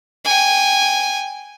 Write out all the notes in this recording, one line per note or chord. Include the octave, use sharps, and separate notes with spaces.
G5 G#5